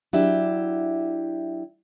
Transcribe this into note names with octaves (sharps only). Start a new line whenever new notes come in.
F#3 D4 E4 G4 E5